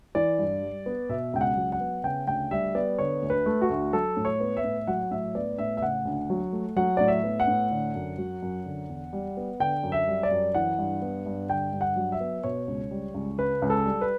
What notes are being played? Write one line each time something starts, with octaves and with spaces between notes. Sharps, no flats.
E3 D5
G2
G3
B3
B2 E5
C#2 G5
F#5
F#3
F#5
B3
C#3 G5
D2 G5
G3 E5
B3 D5
D3 C#5
D2
B4
A3
F#4
D2
F#3 A4
A2
C#5
B3
E5
A2
F#3 F#5
A2 E5
B3 D5
A2 E5
E5
C#3 F#5
D2
F#3
A3
F#3 F#5
A2 D5
E5
B3
F#5
A2
D3
F#2
F#3
F#2
D3
E2
G3
B3
D3 G5
F#2
E5
G3
D5
F#2
E3 F#5
G2
B3
G2
D3 G5
G2
F#5
F#3
E5
B3
B2 C#5
C#2
G3
C#2
C#3 B4
C#2
A4
G3
B4